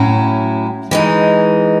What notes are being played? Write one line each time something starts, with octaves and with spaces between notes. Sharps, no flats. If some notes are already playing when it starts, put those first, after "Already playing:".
Already playing: A2 F#3 C#4 E4
E3 G#3 D#4